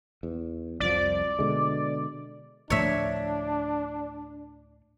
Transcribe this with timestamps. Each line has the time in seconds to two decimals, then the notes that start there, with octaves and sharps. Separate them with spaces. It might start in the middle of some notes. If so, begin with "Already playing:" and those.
0.23 E2
0.80 C2 F2 F3 D5
1.39 B2 D3 G#3
2.70 D2 A2 F3 D4 C#5 E5